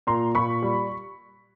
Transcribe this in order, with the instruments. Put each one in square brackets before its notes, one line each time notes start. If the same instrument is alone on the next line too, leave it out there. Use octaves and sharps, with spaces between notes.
[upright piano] A#2 A#5 C6
A#2 B5 C#6
G3